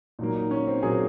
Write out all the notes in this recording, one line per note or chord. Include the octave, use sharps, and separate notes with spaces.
A#2 F#3 A#3 D#4
D#4
C#4
C4
A#2 F#3 A#3 G#4